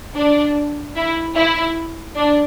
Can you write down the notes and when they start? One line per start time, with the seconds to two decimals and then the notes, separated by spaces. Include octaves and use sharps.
0.15 D4
0.95 E4
1.35 E4
2.16 D4